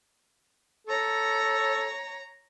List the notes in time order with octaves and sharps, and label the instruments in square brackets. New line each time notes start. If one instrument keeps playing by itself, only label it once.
[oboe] A4 [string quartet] C#5 A#5